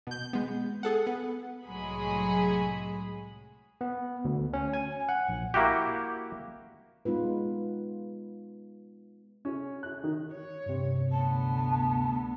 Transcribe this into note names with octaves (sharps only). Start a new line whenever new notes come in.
B2 G6
G#3 B3
G#4 A4 F#5
B3
C2 A2 F#3 G#3 G#4 B5
B3
D2
C#4
G#5
F#5
A#1
A#3 E4 F#4 G4
G#3 B3 D#4 F4 B4
C#4
F#6
D#3
C#5
G2 C3
D2 B3 A5